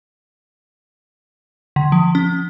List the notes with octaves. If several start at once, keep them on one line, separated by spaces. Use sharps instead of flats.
D3
F3
C#4